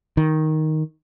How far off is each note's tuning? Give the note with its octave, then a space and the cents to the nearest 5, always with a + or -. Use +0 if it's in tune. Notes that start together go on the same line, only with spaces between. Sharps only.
D#3 +5